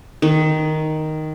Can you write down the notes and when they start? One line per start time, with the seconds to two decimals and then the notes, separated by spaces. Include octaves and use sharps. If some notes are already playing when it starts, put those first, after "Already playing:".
0.22 D#3